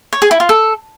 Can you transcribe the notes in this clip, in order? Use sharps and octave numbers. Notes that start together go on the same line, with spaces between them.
C#5
G#4
E4
F4
A4